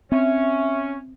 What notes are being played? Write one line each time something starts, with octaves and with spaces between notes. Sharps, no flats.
C4 C#4 E5